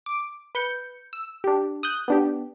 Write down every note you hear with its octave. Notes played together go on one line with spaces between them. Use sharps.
D6
B4 G6 C#7
E6
D4 G4
D#6 F#6 G6
B3 D4 G4